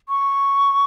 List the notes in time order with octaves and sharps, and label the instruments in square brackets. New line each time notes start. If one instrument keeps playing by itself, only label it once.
[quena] C#6